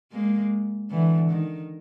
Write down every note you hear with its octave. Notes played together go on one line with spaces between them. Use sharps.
G#3 A#3
D3 E3
D#3